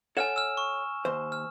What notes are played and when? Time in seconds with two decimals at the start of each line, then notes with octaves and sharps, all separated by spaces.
0.17 A4 C#5 F#5 G#5 F6 E7
0.36 E6 F6
0.57 C#6
1.05 D#2 C5
1.32 F6